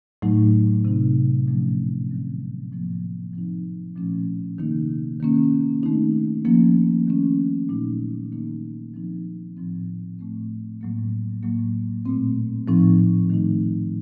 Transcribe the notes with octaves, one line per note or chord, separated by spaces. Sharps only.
A2 F#3 A3 D#4
C3 F#3 C4 D#4
A#2 F3 A3 C#4
D#3 F#3 C4
A2 F3 A#3
F3 C4 D#4
A#2 F3 A3 C#4
C3 D#3 A#3 D#4
D#3 A#3 C#4
D#3 A3 C4 D#4
F3 A#3 C#4
D#3 A3 C#4
A#2 F#3 A3 D#4
D#3 A#3 D#4
F3 C4 D#4
A2 F3 C4
A2 A3 C4
A2 F#3 A#3
A2 F#3 A#3
A#2 A3 C4
A2 F3 C4 D#4
D#3 A3 D#4